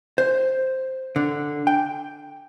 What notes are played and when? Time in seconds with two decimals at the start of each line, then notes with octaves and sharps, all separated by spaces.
0.18 C5
1.16 D3
1.67 G5